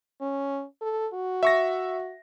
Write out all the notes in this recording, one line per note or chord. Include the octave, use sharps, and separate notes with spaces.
C#4
A4
F#4
E5 C#6 A#6